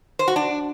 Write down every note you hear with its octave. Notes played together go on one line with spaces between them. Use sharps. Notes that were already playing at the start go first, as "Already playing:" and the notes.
C5
F#4
D4